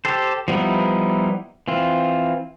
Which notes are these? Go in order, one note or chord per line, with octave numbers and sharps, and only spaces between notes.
G4 A4 C5
F3 G3 B3 D#4 E4
E3 C4 F4